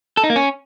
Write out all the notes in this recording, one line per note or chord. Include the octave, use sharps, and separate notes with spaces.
A4
D#4
A#3
C#4